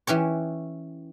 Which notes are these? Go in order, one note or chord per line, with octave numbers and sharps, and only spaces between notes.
E3 C#4 G4 C#5